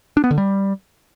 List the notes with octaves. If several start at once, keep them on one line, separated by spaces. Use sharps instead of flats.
D4
B3
D3
G3